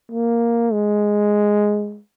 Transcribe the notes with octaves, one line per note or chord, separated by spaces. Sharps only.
A#3
G#3